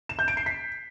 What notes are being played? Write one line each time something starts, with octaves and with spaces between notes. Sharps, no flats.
E7
G6
D7
C7
B6